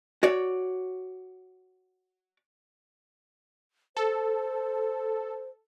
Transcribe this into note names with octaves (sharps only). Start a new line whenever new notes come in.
F#4 C#5 D5
A4 C5